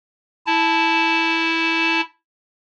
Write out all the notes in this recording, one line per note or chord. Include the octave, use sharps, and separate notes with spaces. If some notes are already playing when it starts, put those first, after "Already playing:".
E4 A5